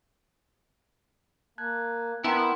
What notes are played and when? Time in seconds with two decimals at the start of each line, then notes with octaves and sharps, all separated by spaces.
1.58 A#3 A5 F#6 G#6
2.24 B3 E4 A#4 G5 A5 A#5 C6